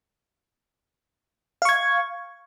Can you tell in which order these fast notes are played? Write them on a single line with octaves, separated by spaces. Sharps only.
F5 C#6 G#6